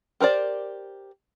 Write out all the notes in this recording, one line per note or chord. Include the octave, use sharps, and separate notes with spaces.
G4 A#4 C5 D5